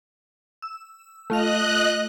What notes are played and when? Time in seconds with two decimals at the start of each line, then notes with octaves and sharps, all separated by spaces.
0.62 E6
1.30 A3 F4 D#5 F#6 F7